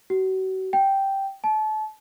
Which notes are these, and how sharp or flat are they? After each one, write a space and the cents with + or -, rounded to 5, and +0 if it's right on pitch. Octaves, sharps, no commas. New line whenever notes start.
F#4 +35
G5 -5
A5 -30